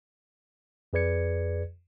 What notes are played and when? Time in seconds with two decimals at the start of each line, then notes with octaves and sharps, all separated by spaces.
0.93 F2 G#4 B4 D5 G#6 C#7